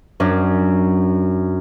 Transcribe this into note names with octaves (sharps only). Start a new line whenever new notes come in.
F#2 C#4 D4